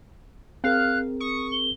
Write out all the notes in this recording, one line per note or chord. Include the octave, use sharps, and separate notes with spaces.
C4 G#4 A#4 F5 F#6
C#6 D#6
G7